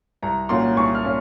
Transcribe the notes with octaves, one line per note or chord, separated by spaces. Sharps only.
C2 A#5
A#2 F#3 C#4 F4 C6
C2 C#6
F6
A#2 C#4 F4